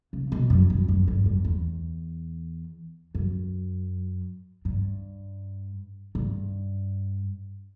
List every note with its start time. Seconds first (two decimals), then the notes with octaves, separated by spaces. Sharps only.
0.13 C#3
0.32 B2
0.50 F#2
0.70 F#2
0.88 F#2
1.08 G2
1.26 F#2
1.45 E2
3.15 F#2
4.65 G2
6.15 G2